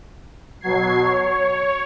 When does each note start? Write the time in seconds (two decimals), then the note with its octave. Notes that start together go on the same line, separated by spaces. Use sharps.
0.61 B2 F#3 G#6 C7
1.00 C#5